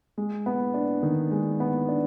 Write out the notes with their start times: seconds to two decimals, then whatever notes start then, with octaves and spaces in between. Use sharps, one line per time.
0.18 G#3
0.46 B3
0.74 D4
1.03 D#3
1.31 G#3
1.60 B3
1.89 D4